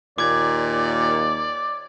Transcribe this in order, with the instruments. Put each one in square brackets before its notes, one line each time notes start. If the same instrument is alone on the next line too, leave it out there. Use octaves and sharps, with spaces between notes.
[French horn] D#2 [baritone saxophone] A#2 [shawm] D5 [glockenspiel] D6 G#6